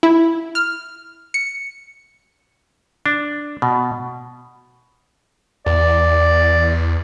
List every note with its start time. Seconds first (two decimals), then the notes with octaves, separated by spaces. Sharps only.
0.03 E4
0.55 F6
1.34 C#7
3.06 D4
3.62 B2
5.66 E2 D5